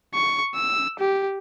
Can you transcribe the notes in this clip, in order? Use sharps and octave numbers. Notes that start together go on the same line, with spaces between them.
C#6
E6
G4